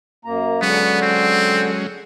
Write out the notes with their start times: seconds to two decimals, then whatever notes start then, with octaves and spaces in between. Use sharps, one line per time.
0.25 F#2 A#3 A#5
0.62 D3 F#3 G#3 B3 C#4
1.02 C4